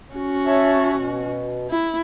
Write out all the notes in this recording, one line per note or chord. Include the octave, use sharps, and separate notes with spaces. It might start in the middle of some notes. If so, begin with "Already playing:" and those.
C#4 F#4
C#5 E5 A5
B2
E4